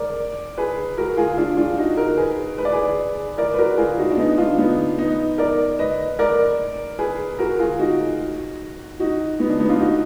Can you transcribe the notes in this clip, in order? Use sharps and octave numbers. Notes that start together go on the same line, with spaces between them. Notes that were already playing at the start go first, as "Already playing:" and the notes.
Already playing: A#4 D5
G#4 B4
F#4 A#4
F4 G#4
D4 F4
D4 F4
D#4 F#4
F#4 A#4
G#4 B4
B4
D5
G#4 B4
A#4 D5
B4
F#4 A#4
F4 G#4
D#4 F#4
D4
B3 D#4
D4 F4
B3 D#4
B3 D#4
A#4 D5
B4 D#5
A#4 D5
G#4 B4
F#4 A#4
F4 G#4
D#4 F#4
D#4 F#4
B3 D#4
D4
B3 D#4
D4 F4
D#4 F#4